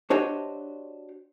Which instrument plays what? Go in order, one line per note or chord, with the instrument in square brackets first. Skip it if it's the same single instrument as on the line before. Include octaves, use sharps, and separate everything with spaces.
[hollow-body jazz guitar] D4 F#4 G4 C5 C#5 D#5